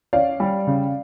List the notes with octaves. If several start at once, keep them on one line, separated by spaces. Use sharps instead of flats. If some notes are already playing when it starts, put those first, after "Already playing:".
C#4 D5 F5
G3
C#3